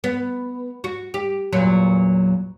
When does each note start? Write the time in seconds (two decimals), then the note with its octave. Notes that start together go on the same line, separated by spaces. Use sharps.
0.04 B3
0.84 F#4
1.14 G4
1.53 E2 A#2 F#3